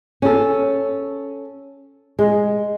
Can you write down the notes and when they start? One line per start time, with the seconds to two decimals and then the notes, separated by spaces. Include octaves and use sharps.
0.22 C#4 A4
2.19 G#3